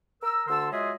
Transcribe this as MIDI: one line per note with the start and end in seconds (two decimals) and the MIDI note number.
0.22 0.44 70
0.22 0.44 88
0.47 0.67 38
0.47 0.67 50
0.47 0.67 81
0.47 0.67 84
0.47 0.67 88
0.71 0.92 54
0.71 0.92 56
0.71 0.92 65
0.71 0.92 68
0.71 0.92 75
0.71 0.92 76